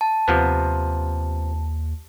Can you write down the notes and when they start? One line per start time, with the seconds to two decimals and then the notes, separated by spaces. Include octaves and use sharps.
0.01 A5
0.28 D#2 C3 F3 B3